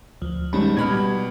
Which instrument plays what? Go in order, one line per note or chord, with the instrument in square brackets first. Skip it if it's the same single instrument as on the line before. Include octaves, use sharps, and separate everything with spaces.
[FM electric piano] D2 F3
[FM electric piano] D#3 G3 C#4 [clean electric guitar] G#3 D#4 B5
[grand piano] B2 B5 F6 [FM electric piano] G#6
[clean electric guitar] G3